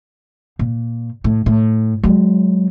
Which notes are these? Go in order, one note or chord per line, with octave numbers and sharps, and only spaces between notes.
A#2
A2
A2
F#3 G#3